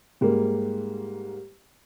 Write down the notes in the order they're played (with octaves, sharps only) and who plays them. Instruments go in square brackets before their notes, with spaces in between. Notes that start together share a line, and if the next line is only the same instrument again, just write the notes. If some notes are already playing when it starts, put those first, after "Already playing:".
[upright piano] G#2 G3 A#3